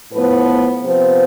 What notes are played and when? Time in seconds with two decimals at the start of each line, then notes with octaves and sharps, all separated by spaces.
0.11 A2 F3 B3 B4
0.84 C3 F3 B3 C5